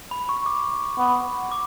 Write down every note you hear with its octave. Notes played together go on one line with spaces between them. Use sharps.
B5
C#6
D6
B3
D6